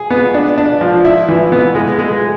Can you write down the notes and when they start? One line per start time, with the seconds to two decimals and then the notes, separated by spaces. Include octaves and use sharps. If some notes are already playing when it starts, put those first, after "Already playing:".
Already playing: G#4
0.10 B3
0.34 D4
0.58 D4
0.81 F3
1.04 E4
1.29 E3
1.52 B3
1.75 G#3
1.99 G#3